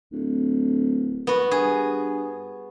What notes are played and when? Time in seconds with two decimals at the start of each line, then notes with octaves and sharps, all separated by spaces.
0.12 D1
1.27 B3 F#4
1.51 G2 G#4